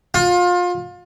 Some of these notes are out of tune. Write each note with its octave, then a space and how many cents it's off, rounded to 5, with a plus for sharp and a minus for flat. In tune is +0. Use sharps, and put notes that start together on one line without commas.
F4 +30